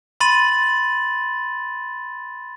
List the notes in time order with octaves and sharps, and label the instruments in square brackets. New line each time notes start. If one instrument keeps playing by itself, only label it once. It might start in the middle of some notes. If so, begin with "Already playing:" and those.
[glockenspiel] B5 C6 A6 D#7 F#7